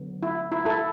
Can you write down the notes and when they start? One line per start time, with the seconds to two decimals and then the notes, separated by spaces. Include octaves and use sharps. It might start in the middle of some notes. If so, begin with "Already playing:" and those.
Already playing: D3 F#3 B3
0.23 E4
0.52 E4
0.65 E4 A4